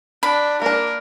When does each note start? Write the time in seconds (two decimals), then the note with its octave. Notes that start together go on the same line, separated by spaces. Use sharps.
0.23 D4 B5
0.62 A#3 D4 A#4